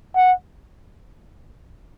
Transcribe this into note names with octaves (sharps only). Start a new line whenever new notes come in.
F#5